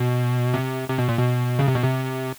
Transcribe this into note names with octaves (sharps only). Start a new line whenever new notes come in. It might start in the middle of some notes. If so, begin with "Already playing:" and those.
Already playing: B2
C3
C3
B2
A#2
B2
C#3
C3
B2
C3